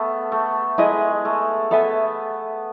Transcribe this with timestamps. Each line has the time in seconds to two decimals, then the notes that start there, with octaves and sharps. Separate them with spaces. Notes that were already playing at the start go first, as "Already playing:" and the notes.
Already playing: A3 B3
0.32 A3
0.78 G#3 E4 G#4 D#5
1.25 A3
1.71 B3 A4 E5 G#5